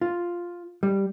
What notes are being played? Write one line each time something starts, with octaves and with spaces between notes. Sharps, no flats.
F4
G3